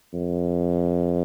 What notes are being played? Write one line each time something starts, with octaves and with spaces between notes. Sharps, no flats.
F2